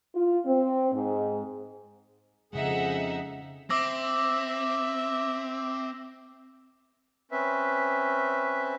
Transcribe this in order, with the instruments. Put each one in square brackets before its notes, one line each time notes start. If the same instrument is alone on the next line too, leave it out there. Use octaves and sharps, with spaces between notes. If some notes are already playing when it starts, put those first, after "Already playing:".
[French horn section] F4
C4
G#2
[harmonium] F2 G#4 [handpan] C#3 G#3 [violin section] D#4 E5 F#5
[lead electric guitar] C4 [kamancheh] E5 [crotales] D6 E6 A#6
[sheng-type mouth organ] C4 C#4 B4 E5